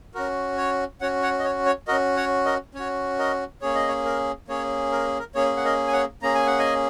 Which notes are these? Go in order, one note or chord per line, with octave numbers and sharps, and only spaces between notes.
C#4 F#4 A#4
C#5
C#4 F#4 C#5 F#5
C#5 F#5
D#5
C#5
C#5
C#4 F#4 A#4 D#5
C#5 F#5
A#4 D#5
C#4 F#4 C#5
A#4 D#5
A#3 C#4 G#4 C#5
D#5
C#5
A#4
A#3 C#4 G#4 C#5
A#4
A#4
A#3 C#4 G#4 C#5
F#5
A#4 D#5
G#5
C#5 F#5
A#3 C#4 G#4 A#5
G#5
F#5
D#5 G#5